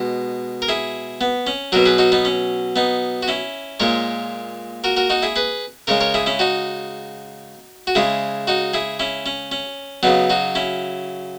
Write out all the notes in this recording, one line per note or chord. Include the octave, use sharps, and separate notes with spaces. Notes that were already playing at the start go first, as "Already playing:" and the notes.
Already playing: B2 G#3
A#4
E4 G#4
B3
C#4
B2 F#3 F#4 A#4
G#4 B4
D#4 F#4
B3 D#4
C#4
B3 D#4
F#4
C#4 E4
A#2 G#3 A#4 C#5
F#4 A#4
F#4 A#4
D#4 F#4
E4 G#4
G#4 B4
C#3 G#3 A#4 C#5
A#4 C#5
E4 G#4
C#4 E4
D#4 F#4
F#4
C#3 G#3 E4 G#4
D#4 F#4
E4 G#4
C#4 E4
C#4
C#4
C#3 F#3 B3 D#4
D#4 F#4
C#4 E4